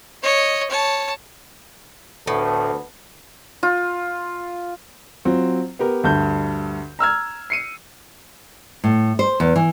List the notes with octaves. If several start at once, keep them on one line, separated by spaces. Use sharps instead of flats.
C#5 D#5
C#5 A5
D2 A2 B3 A4
F4
F#3 C4 F4
B3 G4 A#4
D2 G2 G6
A#5 E6 F6 G#6
C7 C#7 D#7
A2
C5
E2
E3